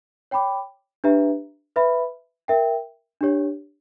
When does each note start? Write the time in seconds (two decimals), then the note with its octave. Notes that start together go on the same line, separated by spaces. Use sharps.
0.31 C#5 G5 B5 D6
1.04 D4 G4 B4 E5 A#5
1.76 B4 E5 B5
2.48 A#4 E5 G5
3.21 D4 G4 C#5